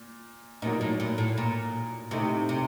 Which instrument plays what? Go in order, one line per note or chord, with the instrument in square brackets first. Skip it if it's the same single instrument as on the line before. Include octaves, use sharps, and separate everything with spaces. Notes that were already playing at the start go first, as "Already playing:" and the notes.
Already playing: [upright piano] A#2
[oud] A#2 [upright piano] F#3 A#3 D#4
[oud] A2
A#2
A2
A#2
[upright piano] A2 A3 D#4 [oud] C3
[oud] C3